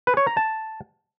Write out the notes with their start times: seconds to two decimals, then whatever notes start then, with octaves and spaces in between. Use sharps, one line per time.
0.07 B4
0.17 C#5
0.27 A#5
0.37 A5